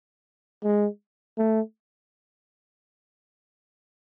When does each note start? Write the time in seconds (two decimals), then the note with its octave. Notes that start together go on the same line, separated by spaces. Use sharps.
0.64 G#3
1.38 A3